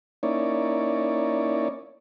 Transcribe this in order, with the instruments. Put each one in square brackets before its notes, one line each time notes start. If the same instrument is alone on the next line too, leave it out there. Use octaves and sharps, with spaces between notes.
[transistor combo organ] A#3 C#4 D#4 E4 C#5 D5